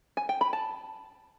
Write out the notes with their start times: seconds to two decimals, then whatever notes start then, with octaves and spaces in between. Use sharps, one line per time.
0.17 G#5
0.29 G5
0.41 B5
0.53 A5